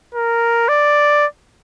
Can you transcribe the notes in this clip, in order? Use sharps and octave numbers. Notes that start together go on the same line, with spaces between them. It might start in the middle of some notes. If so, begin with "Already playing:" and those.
A#4
D5